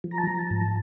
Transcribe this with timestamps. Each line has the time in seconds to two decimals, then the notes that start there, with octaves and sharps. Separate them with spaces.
0.04 F3
0.11 A#5
0.18 A5
0.25 F3 A#5
0.39 A5
0.50 G#2